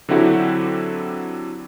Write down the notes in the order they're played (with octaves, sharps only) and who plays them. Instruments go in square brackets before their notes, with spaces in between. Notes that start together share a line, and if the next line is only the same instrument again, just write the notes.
[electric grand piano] D3 F#3 C4 E4 F#4 G4